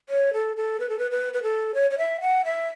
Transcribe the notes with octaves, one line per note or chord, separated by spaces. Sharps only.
C#5
A4
A4
B4
A4
B4
B4
B4
A4
C#5
C#5
E5
F#5
E5